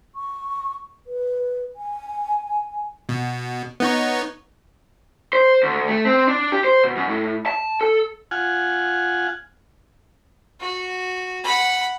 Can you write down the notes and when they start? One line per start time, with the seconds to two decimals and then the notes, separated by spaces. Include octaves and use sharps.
0.15 C#6
1.07 B4
1.76 G#5
3.09 B2
3.80 B3 D#4 C#5
5.33 C5
5.63 D2
5.88 A3
6.05 C4
6.28 D4
6.52 G4
6.64 C5
6.84 B2
6.96 F#2
7.09 A2
7.46 A5
7.81 A4
8.31 F4 F#5 G#5
10.60 F#4
11.44 F#5 B5